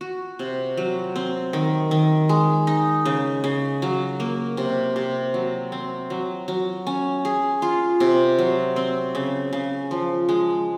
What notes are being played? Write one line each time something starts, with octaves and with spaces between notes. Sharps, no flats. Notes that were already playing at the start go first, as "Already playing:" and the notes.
F#4
C3
F#3
C4
D#3
D#3
G#3
D#4
C#3
C#3
F#3
A#3
C3
C3
F#3
C4
F#3
F#3
C#4
G#4
F4
C3
F#3
C4
C#3
C#3
F3
G#3